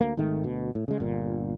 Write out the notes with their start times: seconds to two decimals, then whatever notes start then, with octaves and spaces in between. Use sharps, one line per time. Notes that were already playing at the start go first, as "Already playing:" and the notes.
0.01 D2 A#3
0.17 G#1 G#2 D#3 A3
0.43 D2 B2
0.75 A2
0.88 C#3 G#3
1.00 G1 A#2